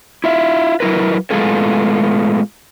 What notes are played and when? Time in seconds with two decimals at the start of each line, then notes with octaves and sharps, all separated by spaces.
0.24 E4 F4 E5
0.80 F#3 E4 A#4 B4
1.30 A2 G#3 B3 F4 G#4 A4